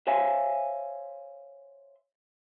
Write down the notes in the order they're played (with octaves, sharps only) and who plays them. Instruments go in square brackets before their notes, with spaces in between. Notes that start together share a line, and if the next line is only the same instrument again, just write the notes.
[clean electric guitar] C5 C#5 E5 F5 G#5